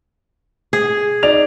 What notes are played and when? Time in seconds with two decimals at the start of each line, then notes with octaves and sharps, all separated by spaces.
0.73 G#4
1.23 D#4 D5 F7